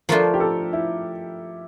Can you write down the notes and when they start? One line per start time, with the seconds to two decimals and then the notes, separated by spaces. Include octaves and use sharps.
0.09 F3 A3 D4 F4 A#4 C5
0.34 G4
0.40 A4
0.73 E4